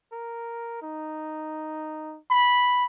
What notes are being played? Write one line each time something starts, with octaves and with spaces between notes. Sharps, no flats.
A#4
D#4
B5